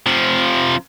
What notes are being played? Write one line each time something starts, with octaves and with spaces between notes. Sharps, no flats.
C3 F3